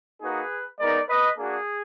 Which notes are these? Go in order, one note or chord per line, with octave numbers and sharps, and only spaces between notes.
A#3 D#4 F#4 G#4 B4
G#3 B3 D#4 A#4 D5
B4 D#5
A#3 D4 F#4 G#4